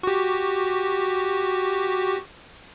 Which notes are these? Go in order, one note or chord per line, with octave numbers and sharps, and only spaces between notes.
F#4 G4